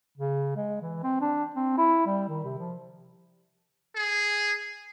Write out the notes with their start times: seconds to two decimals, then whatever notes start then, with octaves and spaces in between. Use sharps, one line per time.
0.18 C#3
0.56 G#3
0.82 E3
1.03 C4
1.21 D4
1.56 C4
1.78 E4
2.06 G3
2.28 D#3
2.45 C3
2.59 F3
3.96 G#4